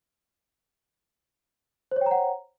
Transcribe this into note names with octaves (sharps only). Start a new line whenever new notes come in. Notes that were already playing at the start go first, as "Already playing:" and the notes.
C5 C#5 F#5 G5 A#5